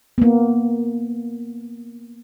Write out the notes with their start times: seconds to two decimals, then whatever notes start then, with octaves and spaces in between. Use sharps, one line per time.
0.18 A#3 B3